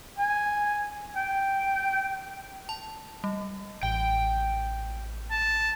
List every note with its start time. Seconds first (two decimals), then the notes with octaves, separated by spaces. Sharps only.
0.18 G#5
1.16 G5
2.69 A5
3.24 G3
3.83 A1 G5
5.31 A5